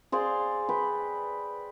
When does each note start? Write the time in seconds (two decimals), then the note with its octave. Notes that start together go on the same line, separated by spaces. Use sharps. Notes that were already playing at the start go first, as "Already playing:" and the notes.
0.12 G#4 C5 D5 F5
0.69 B4 G5